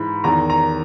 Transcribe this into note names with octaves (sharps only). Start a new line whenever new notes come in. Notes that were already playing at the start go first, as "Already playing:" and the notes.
Already playing: G#2 E3 B5
E2 D#3 A#5
A#5